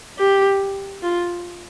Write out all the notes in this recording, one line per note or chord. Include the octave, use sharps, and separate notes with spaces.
G4
F4